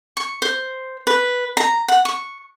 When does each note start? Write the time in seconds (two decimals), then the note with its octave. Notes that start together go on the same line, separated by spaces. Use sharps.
0.17 C#6
0.42 C5
1.07 B4
1.57 A#5
1.88 F#5
2.05 C#6